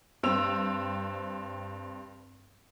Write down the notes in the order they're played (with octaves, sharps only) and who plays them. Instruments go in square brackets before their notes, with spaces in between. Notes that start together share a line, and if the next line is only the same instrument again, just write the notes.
[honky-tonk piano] G2 C4 E6 F7